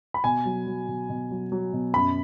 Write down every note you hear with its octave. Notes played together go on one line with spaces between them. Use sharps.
B5
B2 G#5
F#3
F#3
B2
B2
F#3
F#3
B2
F#2 B5